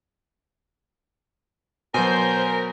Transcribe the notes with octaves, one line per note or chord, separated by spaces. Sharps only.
B2 F#3 A#4 C5 G#5 G6